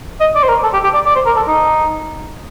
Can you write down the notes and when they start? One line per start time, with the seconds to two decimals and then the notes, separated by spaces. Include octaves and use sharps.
0.21 D#5
0.35 D5
0.43 C5
0.49 A#4
0.63 A4
0.73 G4
0.84 G4
0.94 D5
1.06 D5
1.16 C5
1.26 A#4
1.37 A4
1.48 D#4